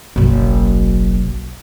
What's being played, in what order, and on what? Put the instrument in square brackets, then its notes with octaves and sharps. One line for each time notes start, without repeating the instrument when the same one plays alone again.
[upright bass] F#1 B1